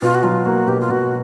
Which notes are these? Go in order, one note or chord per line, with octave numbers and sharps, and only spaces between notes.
B2 F4
F#4
F#3 F4
A#3 F#4
B2 G4
F4
B2 F#4